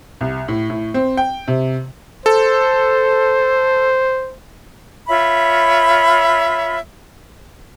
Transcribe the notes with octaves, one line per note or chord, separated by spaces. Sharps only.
C2
A2
A2
C4
G5
C3
A4 C5
F4 C#5 E5 B5